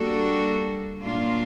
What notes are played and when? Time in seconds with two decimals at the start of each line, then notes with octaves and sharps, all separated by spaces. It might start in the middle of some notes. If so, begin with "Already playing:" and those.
Already playing: G3 A#3 D4 F#4 A4
1.02 A#2 F#3 A#3 D4 F4